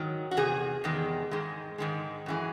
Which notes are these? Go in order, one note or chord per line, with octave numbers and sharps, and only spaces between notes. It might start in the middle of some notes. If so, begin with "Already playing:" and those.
Already playing: G#2 D#3 F#3
F#4
E2 C3 G#4
E2 C3 D#3 G#3
G#2 D#3 G#3
G#2 D#3 G#3
F#2 E3 G#3